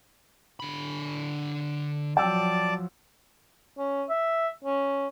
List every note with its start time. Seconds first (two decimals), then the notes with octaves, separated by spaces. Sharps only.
0.60 D3 B5
2.17 F3 F#3 D5 G5 A5 E6
3.78 C#4
4.09 E5
4.64 C#4